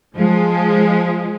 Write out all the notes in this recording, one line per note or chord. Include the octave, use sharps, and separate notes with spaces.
F3 G#3